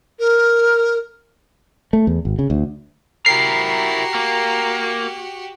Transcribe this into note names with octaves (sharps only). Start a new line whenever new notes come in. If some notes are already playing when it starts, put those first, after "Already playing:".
A#4
A3
E2
G#1
C#3
D2
E4 F#4 G4 A#4 A#5 C7
A#3